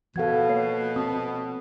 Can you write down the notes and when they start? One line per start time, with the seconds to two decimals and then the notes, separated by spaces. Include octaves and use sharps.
0.16 B2 F3 A4 F5 F#5 G#6
0.49 A#3 C#5 C7
0.96 C4 A5 D#6